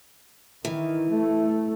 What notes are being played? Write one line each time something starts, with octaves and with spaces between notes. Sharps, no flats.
D#3 E3
A3